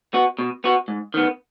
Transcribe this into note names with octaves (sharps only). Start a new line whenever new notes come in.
B3 F#4
B2
B3 F#4
G#2
D#3 B3